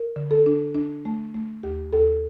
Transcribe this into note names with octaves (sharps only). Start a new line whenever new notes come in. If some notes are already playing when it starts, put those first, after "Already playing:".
Already playing: A#4
D3
A4
D4
D4
A3
A3
D#2 G4
D#2 A4